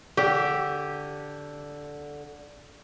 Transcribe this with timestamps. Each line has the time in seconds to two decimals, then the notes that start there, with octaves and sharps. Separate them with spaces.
0.17 D3 G4 G#4